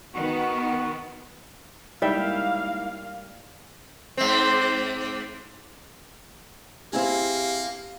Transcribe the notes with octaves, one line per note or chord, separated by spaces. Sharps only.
D#3 B3 F#4 C#6
G3 G#3 A#3 D#4 E4 E5 F5 G5
G#2 C4
A#3 C4 E4 G4 G#4 F5